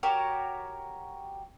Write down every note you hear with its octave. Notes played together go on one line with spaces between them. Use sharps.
F#4 G4 A#4 C#5